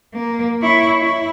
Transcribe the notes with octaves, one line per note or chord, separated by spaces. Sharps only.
A#3
E4 C#5
E4